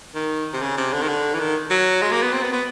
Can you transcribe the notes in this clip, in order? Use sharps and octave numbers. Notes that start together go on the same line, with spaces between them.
D#3
C3
C#3
C3
D3
D#3
D3
E3
D#3
F#3
G#3
A#3
B3
C4
B3
B3